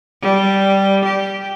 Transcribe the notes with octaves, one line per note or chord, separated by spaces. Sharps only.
G3
G4